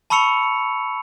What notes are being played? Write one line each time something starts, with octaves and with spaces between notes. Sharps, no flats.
A5 B5 C#6 E6 C#7 F7